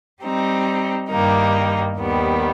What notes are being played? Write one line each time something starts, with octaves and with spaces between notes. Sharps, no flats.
G3 C4 D#4
G2 D#3 G3 A#3 D#4
D#2 D#3 G3 B3